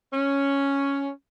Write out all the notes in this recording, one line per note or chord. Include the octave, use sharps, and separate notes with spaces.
C#4